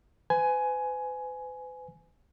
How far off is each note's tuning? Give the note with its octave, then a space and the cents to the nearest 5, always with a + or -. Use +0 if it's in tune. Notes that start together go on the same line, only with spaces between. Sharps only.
B4 +45 G#5 +10